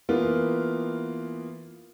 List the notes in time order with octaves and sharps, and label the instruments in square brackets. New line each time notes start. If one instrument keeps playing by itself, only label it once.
[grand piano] E3 A#3 B3 F4